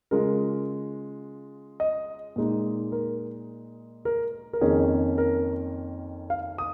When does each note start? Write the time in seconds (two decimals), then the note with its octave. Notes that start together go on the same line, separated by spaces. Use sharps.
0.11 C#3 G#3 F4 A#4
1.80 D#5
2.36 A#2 G#3 D#4
2.92 A#4
4.05 A#4
4.53 A#4
4.61 F2 D#3 A#3 C#4 G#4
5.18 A#4
6.30 F5
6.58 D#6